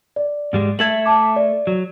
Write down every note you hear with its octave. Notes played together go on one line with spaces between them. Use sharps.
D5
G#2 G3 G#3
A3 A4 E5 G#6 F#7
A5 D6
D5
F#3